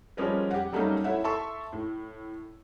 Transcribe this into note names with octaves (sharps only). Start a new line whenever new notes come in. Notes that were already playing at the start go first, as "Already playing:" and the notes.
F3 G3 G#3 C#4 A#4 B4
G4 F#5
F#3 G3 A3 A#3 C#4 D#4
A3 E4 C#5 E5 F#5
A4 E5 A5 C6 C#6 E6
A2